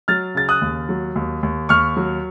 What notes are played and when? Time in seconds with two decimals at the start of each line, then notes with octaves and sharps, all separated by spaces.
0.08 F#3 F6 A6
0.35 C#3 A6
0.49 D#6 F#6
0.62 D#2
0.89 F#3
1.16 D#2
1.43 D#2
1.69 D#2 C#6 F6
1.97 F#3